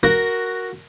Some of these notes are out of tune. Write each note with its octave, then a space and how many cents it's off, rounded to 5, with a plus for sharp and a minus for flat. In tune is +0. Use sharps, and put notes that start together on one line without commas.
F#4 +0 A#4 +0